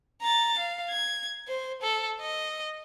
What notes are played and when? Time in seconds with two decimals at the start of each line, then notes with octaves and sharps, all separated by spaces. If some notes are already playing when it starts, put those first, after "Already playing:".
0.22 A#5 A6
0.59 F5
0.90 G#6
1.48 C5
1.82 A4
2.21 D#5